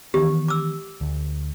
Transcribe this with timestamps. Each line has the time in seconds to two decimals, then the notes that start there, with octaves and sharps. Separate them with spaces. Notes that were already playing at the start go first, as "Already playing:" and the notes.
0.14 D#3 E3 B3 G4
0.48 D6 E6
1.01 D2